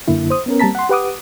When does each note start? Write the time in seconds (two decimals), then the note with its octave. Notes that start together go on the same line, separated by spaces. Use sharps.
0.08 F#2 D3 A#3 E4
0.30 C5 D#6
0.46 B3 C#4 A#4
0.60 G3 A#3 C4 A5 A#5 B6
0.75 F#5 C6
0.89 G4 B4 F#5 D6 D#6